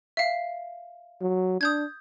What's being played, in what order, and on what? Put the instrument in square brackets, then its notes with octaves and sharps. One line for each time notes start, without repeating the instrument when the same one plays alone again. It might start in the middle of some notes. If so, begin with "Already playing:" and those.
[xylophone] E5 F5
[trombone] F#3
[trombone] D4 [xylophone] D#6 G6 G#6